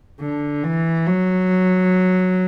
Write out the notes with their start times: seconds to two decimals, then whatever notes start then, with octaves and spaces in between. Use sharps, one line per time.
0.21 D3
0.64 E3
1.07 F#3